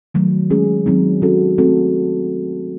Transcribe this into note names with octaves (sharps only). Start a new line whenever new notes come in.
D#3 F#3 A3
G#3 C#4 G#4
D#3 F#3 C4 D#4
F#3 C#4 F#4 A4
A3 C4 F#4 A4